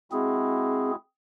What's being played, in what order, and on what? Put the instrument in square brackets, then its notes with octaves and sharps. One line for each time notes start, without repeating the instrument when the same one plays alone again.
[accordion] G#3 E4 F#4 [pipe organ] C4 G#4